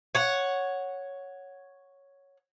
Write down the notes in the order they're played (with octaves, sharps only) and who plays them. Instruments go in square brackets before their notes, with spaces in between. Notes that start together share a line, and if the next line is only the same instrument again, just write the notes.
[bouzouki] C#5 F#5